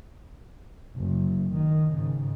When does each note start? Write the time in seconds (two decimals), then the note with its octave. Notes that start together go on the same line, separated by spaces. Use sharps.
0.96 F#1
1.53 D#3
1.91 G#2 C#3